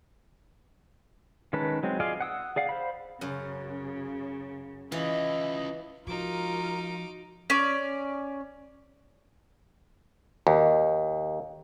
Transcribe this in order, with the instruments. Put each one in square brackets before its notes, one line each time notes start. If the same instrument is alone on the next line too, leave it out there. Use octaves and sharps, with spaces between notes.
[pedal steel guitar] D#3 G#3 C#4 B4 A5
F#3 G#3 C4
F4 G#4 D5 D#5 F5
F#5 D#6 E6
G#4 D5 F5 F#5
C5 F5 B5
[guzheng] F#2 [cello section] C#3
[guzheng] E3 [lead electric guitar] C#4 F4 [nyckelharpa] E4 D#5
[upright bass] F3 G#3 [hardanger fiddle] D#4 D6 [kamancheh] F4 A#4 [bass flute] F#4
[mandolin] C#4 D5
[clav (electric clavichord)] D#2